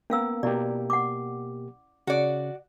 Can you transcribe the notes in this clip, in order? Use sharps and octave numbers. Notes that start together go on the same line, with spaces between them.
A#3 B3 C#4 A#4 F5 E6
B2 A#3 E4 G4 D5
F#5 D6
C#3 F#4 D5